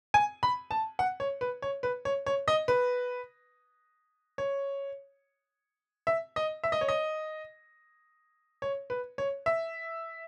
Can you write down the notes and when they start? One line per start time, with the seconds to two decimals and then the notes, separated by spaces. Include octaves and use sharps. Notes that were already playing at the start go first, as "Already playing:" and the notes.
0.14 G#5
0.43 B5
0.71 A5
0.99 F#5
1.20 C#5
1.41 B4
1.62 C#5
1.83 B4
2.05 C#5
2.26 C#5
2.48 D#5
2.68 B4
4.38 C#5
6.07 E5
6.36 D#5
6.63 E5
6.72 D#5
6.81 C#5
6.88 D#5
8.62 C#5
8.90 B4
9.18 C#5
9.46 E5